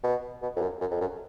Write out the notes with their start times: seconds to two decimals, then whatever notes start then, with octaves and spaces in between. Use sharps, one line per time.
0.04 B2
0.42 B2
0.56 F2
0.62 F#2
0.81 F#2
0.91 F2
1.01 F#2